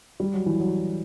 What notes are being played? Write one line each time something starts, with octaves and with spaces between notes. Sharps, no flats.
G3
F#3
E3
F#3